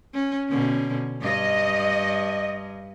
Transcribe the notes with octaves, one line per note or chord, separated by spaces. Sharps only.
C#4
B2 D3 C#4
G2 D#5